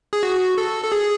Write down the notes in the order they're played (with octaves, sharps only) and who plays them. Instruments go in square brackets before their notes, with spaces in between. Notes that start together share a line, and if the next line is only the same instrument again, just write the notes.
[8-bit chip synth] G#4
F#4
A4
A4
G#4